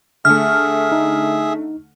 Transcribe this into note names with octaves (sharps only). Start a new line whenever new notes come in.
D3 A3 G#4 E5 F6
D#4